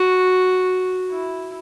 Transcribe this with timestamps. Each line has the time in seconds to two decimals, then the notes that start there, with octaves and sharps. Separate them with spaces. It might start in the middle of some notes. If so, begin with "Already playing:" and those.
Already playing: F#4
1.10 E4